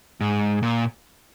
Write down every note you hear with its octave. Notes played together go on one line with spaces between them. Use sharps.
G#2
A#2